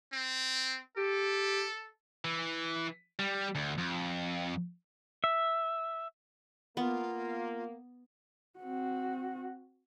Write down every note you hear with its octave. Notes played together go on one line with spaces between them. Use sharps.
C4
G4 A4
E3
G3
D2
F2
E5
A#3 B3 F4
C4 F#4